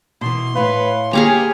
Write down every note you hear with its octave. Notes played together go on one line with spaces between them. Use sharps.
B2 E3 C6
A2 B4 C#5 F5
A#3 G4 G#4 B4 C#5 F5 G#5 A#5